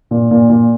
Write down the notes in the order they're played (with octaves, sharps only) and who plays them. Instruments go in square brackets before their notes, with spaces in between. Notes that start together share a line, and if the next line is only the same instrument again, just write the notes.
[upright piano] A#2
A#2
A#2